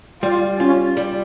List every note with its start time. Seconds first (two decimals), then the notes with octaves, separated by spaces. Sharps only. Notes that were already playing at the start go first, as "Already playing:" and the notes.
0.23 G3 F4
0.60 C#4 F4
0.97 G3